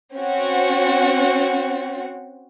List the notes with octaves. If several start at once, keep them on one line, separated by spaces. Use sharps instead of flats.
C4 C#4 F#4